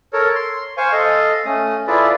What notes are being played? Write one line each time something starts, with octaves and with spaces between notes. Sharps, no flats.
A4 A#4 C#5
C6
C5 F5 G#5 C#6
A4 D#5 F5
A3 C#4 D#6
E4 F4 G#4 A4 B4 D5